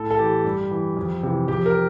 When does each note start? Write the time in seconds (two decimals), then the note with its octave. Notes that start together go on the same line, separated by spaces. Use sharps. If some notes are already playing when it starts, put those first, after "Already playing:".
Already playing: A2 A4
0.11 A4
0.19 E3 G4
0.44 G2
0.71 E3
0.97 F2
1.23 C3 E3
1.48 F2 G4
1.66 A#4